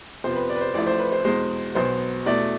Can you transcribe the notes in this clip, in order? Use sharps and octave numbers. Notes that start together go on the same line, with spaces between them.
F2 C3 F3 B3 C5
B4
D5
B4
C5
A1 A2 F3 A3 D5
C5
B4
C5
E2 B2 G#3 C5
B1 B2 B3 C5
E2 B2 A3 D5